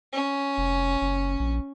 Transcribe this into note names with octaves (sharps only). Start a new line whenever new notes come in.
C#4
F1
F#1
A#1